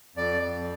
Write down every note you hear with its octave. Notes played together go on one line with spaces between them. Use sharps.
F2 D5
F2